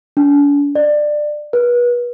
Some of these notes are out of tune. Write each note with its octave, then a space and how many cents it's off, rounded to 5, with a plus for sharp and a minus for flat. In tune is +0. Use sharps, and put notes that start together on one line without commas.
D4 -45
D5 +20
B4 -35